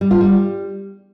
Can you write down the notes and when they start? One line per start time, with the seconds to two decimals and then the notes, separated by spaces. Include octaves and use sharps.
0.01 G3
0.11 F4
0.21 G3